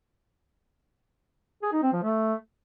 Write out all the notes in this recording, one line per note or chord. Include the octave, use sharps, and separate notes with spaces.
G#4
D#4
C4
F3
A3